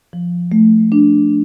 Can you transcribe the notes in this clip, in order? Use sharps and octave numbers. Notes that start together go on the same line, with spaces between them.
F3
A3
D4